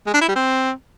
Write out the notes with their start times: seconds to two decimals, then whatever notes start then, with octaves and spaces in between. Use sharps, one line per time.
0.07 G#3
0.14 D4
0.21 E4
0.28 G3
0.36 C4